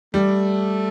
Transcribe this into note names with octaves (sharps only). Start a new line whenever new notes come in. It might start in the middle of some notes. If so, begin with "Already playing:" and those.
G3 A3